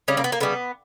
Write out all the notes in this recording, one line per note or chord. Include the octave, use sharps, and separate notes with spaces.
C#3 G3 C#4
A#3
B3
A#3
C#3 G3 B3